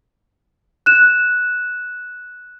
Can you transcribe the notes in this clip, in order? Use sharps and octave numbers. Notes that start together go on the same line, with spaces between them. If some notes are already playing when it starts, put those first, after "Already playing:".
F#6 E7